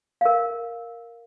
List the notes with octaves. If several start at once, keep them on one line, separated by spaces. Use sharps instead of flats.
A#4 F5